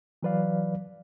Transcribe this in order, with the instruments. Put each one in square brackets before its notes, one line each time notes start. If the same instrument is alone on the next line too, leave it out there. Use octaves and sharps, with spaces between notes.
[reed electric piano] E3 F#3 B4 D5 F5